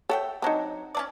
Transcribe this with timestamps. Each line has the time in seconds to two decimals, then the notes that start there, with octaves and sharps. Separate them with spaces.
0.09 A4 C#5 E5 F#5 G5
0.42 F#3 C4 D4 D#4
0.95 C#4 D4 D5